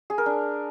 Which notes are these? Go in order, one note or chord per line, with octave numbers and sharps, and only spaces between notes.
G#4
A#4
D4